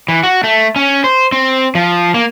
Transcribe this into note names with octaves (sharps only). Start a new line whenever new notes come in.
E3
F#4
A3
C#4
C5
C4
F3
A#3